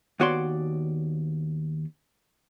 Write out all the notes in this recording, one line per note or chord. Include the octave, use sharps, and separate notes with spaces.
D#2 B3 F#4 C#5 D5 C6